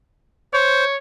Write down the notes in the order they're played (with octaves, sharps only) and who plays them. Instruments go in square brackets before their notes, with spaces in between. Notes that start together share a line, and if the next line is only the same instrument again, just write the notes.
[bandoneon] C5 [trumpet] C#5